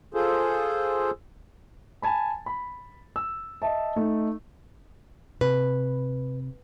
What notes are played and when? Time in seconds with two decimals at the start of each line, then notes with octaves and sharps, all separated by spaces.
0.14 F4 G#4 A4 C5
2.02 G#5 A5 B5
2.46 B5
3.16 E6
3.62 D#5 E5 A5
3.96 A3 D#4
5.41 C3 B4